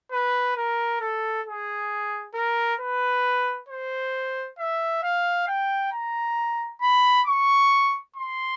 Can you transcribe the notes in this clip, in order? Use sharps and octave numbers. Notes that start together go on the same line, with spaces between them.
B4
A#4
A4
G#4
A#4
B4
C5
E5
F5
G5
A#5
B5
C#6
C6